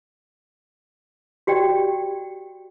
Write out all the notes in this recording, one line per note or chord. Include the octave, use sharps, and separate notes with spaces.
F#4 G4 D5 G5